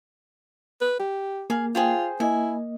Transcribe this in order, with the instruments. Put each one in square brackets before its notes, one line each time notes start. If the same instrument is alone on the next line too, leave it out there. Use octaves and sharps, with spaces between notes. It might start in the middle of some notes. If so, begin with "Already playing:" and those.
[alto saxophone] B4
G4
[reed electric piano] A#3 [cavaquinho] G#4 F5
[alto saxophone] F4 [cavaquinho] G#4 C5 G5
[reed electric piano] A#3 D#5 [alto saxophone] E4 [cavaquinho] G#5